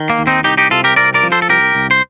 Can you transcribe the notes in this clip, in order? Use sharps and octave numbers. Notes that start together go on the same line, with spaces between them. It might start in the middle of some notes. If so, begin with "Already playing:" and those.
Already playing: D#3
A#3
D#2
C4 D#4
C2 D#4 G4
D#4 G4
C3 F4 A4
G4 A#4
C2 A#4 D5
A#4 D5
F3
A4 C5
A4
C2 G4 A#4
C2
C5